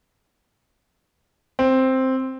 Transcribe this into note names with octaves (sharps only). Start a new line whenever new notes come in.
C4